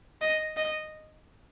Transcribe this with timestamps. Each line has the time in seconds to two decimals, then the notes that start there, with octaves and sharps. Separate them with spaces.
0.21 D#5
0.57 D#5